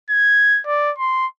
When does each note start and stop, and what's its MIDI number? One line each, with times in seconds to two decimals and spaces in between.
0.10 0.61 92
0.66 0.92 74
0.99 1.26 84